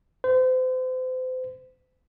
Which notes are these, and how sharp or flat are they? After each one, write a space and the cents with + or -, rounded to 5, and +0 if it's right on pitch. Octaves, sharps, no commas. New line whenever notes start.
C5 -35